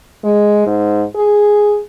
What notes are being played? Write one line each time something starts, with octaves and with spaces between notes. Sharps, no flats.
G#3
G#2
G#4